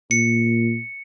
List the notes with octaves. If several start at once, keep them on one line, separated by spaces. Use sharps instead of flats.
A#2 C#7